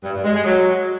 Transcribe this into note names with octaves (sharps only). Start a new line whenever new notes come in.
G2
G2
G#3
G#3
F#3